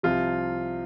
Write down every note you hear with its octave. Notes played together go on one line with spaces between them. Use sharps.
C2 C3 F3 F4